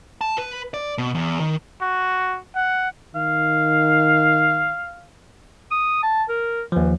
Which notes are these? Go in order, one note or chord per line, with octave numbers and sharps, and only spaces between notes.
A5
B4
D5
B2
E2
D#3
F#4
F#5
D#3 F5
D#6
A5
A#4
D#2 E3 F3